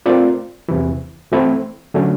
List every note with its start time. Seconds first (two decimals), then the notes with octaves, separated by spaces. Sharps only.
0.06 A3 C4 F4 A#4 D5
0.69 E2 C3 E3
1.32 E3 A3 C4 E4
1.94 D3 F#3 A3 C#4